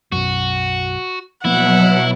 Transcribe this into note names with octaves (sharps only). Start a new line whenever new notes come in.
B1 F#2 F#4
B2 F3 F#3 A#3 B3 E4 F#5